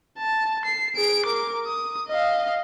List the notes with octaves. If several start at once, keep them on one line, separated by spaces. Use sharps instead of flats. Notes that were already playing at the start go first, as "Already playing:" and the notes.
A5
C7
G#4 D7
A#4 D6
D#6
D#5 F5